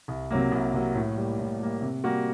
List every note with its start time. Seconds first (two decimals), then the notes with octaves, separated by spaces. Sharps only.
0.08 C2
0.31 C3 F#3 A#3
0.52 C2
0.74 C3 F#3 A#3
0.95 A2
1.17 G3 A#3
1.39 A2
1.60 G3 A#3
1.82 C3
2.04 G3 A#3 F#4